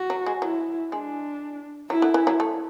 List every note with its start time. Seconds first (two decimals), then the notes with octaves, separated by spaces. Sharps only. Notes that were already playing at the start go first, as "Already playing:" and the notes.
Already playing: F#4
0.10 F#3
0.26 G#3
0.42 F#3 E4
0.92 G#3 D4
1.90 F#3 E4
2.02 D3
2.14 E3
2.27 F#3
2.40 A3